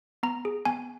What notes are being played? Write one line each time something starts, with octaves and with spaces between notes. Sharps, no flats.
B3 A#5
G#4
B3 G#5